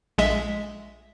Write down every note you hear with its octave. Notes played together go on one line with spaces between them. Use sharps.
A#1 G#3 D#5 E5 B6